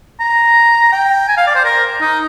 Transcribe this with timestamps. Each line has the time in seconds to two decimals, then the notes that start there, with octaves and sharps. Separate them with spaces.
0.20 A#5
0.92 G5
1.28 G#5
1.37 F5
1.47 D5
1.55 C5
1.65 A#4
2.01 D#4